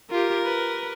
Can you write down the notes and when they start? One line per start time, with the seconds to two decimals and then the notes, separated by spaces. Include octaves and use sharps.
0.11 F4 G4 A#4
0.45 B4